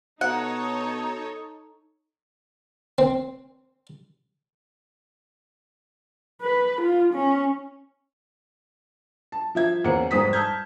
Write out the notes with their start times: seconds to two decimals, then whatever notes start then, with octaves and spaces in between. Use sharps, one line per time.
0.21 B2 D#4 A4 C#5 F#5
2.98 C4
6.42 B4
6.82 F4
7.14 C#4
9.32 A5
9.55 F3 E5 G#6
9.84 E2 A#3 C#4 C5 C#7
10.11 F1 G#2 C5 D#6 B6
10.33 A5 E6 F6 G6 G#6